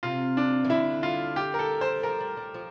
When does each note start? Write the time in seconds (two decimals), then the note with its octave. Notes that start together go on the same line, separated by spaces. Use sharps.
0.03 C3 F4
0.37 D4
0.64 E3
0.70 D3 E4
1.03 F4
1.36 G4
1.54 A#4
1.59 A4
1.81 C5
2.03 F3 A#4
2.20 G3
2.37 G3
2.54 F3